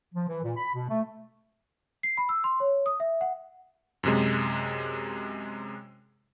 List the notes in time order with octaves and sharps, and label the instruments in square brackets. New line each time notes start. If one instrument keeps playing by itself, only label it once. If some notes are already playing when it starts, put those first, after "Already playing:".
[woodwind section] F3
E3
A#2
B5
B2
A3
[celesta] C7
B5
E6
C6
C#5
D#6
E5
F#5
[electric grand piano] F#2 C3 G#3